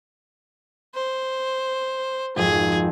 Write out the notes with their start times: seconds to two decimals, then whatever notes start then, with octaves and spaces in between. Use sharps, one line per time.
0.94 C5
2.36 G#1 F2 G#4